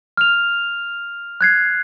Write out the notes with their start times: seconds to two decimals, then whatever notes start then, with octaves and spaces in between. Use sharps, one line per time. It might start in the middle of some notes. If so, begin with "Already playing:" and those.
0.17 F6 F7
1.41 F#6 G#6 C7